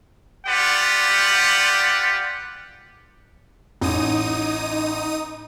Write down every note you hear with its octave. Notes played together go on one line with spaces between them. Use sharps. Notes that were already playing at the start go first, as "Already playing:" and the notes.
F4 G4 B4 D5 F#5
A1 D#4 D#6 D#7